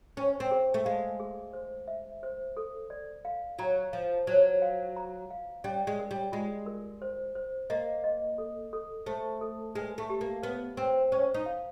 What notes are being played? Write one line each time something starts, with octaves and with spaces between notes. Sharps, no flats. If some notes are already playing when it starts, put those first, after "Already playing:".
C#4 C5
C4
G#4
A3
G#3 F5
G#4
C5
E5
C5
A4
D5
F5
F#3 A#5
F3 F5
F#3 C5
F5
A#5
F5
G3 C#4
G#3
A#4
G3
G#3 F4
A#4
C5
C5
A#3 D#5
D#5
A4
A4
A3 C5
A4
G#3 B4
A3
G4
A#3
B3 B4
C4 B4
C#4 C5
D#4
F5